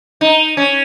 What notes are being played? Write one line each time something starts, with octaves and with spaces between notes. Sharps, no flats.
D#4
C#4